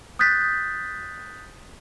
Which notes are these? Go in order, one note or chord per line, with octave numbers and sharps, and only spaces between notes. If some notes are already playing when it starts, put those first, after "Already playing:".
D#6 F#6 G6 A6 B6